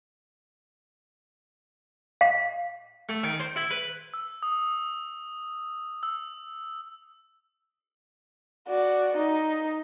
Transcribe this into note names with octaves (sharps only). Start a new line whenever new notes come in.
F5
A3
D#3
C5
E4
B4
E6
D#6
E6
F#4 D5
D#4